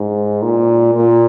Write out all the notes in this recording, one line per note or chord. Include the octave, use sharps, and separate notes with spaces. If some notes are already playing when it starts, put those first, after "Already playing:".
Already playing: G#2
A#2
A#2